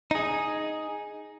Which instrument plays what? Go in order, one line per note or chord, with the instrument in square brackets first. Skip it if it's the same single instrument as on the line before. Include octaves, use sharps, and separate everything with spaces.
[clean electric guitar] D#4 G#4